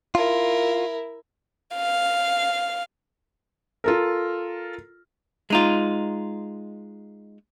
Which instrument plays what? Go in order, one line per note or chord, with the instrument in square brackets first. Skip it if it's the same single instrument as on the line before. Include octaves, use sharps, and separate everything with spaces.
[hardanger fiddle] E4 A#4 [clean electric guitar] F4
[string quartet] F5
[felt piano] F4 A4 A#4
[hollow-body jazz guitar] G#3 D#4 F4